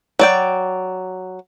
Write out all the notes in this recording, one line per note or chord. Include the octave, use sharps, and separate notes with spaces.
F#3 D5 G5